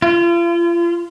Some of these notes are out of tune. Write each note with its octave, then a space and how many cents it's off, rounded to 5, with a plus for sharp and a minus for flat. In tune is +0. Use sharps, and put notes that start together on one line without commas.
F4 -35